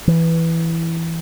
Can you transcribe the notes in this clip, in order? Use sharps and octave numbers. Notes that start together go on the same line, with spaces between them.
E3